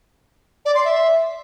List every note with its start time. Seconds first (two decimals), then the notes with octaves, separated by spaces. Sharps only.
0.65 D5
0.75 C6
0.85 E5